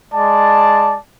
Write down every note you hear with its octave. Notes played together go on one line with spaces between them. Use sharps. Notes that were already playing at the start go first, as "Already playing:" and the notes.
G#3 D5 A5